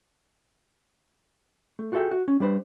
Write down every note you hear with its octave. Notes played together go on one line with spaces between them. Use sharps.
A3
F4 F#4 G#4 A4 E5 G5
F#4
C#4
G3 D4 B4 C5